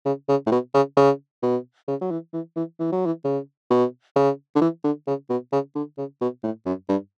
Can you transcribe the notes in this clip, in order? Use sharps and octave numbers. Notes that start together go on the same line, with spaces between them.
C#3
C#3
A2
B2
C#3
C#3
B2
C#3
F#3
E3
E3
E3
E3
F#3
E3
C#3
B2
C#3
D3
E3
D3
C#3
B2
C#3
D3
C#3
B2
A2
F#2
G2